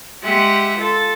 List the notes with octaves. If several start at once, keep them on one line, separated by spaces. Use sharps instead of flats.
G#3 G4 E5 F#5 G5
F4 A4